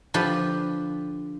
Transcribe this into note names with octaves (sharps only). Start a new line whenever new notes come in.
D3 F3 G4 B4